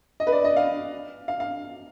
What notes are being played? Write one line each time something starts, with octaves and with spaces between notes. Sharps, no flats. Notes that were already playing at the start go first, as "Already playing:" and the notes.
D#5
B4
D5
D#5
F5
F5
F5